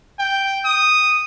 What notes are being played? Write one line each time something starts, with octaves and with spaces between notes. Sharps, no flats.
G5
D#6